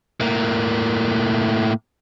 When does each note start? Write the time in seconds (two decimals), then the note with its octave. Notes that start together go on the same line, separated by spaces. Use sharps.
0.21 A2 A#3